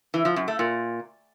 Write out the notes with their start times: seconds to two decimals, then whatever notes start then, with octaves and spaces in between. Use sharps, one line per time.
0.14 E3
0.25 F3
0.36 F#2
0.48 A3
0.59 A#2